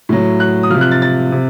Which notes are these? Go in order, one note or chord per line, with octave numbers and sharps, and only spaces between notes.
A2 F#3
F#6
D#6
C3 F3 F6
F#6
A6
A6
C3